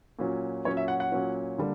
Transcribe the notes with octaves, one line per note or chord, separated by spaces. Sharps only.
A#2 F#3 C#4
A#2 F#3 C#4 C#5
E5
F#5
F#5
A#2 F#3 C#4
D3 G3 A#3 D4